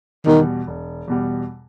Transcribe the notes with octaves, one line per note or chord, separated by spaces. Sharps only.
E2 B2 D#3 G3
E1
E2 B2 G3